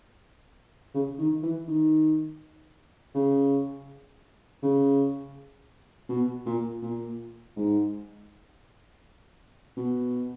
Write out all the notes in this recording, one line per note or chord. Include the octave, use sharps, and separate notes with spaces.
C#3
D#3
E3
D#3
C#3
C#3
B2
A#2
A#2
G#2
B2